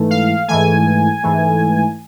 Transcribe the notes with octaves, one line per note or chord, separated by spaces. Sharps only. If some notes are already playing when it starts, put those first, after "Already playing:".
Already playing: G#2 E3 A3
F5
G#2 E3 A3 G#5
G#2 E3 A3